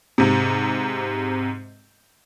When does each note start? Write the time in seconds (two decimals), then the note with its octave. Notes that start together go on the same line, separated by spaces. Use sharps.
0.18 G#2 C3